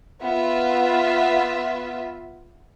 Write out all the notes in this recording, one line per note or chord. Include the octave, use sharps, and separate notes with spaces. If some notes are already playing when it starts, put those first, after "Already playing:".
B3 F4 E5